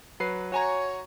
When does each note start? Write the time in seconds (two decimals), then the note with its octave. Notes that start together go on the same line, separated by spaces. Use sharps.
0.20 F#3 B4 C7
0.52 F#4 C#5 G#5 A#5